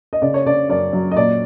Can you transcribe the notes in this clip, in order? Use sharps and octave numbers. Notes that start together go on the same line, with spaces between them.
D#5
C#3 D5
C#5
C#3 D5
F#2 D5
F#3
D#5
A#2 D5